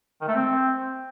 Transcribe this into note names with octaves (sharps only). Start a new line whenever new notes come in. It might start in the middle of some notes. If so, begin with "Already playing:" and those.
D#3
A3
C4